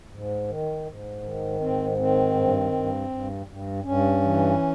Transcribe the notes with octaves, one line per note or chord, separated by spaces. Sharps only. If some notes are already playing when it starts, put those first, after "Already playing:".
G#2
D#3
G#2
D#3
G#2 C4
D#3 C4
G2
G2
G2
G2
G2 C#4
E3